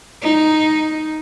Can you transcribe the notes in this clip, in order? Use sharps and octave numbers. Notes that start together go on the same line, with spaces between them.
D#4